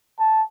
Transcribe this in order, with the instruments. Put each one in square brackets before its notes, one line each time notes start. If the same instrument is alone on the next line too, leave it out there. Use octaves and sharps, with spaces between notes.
[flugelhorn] A5